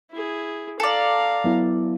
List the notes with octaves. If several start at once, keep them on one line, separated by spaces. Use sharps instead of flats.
E4 G#4
A4 D5 F5 A#5
F#3 B3 E4